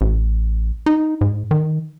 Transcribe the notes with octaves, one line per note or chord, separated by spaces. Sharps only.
A1
D#4
G#2
D#3